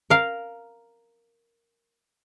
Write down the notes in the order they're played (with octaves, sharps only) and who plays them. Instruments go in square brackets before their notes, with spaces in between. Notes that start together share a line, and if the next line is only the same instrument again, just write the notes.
[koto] A#4 F5